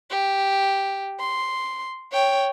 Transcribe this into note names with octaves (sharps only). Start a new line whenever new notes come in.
G4
C6
C#5 G5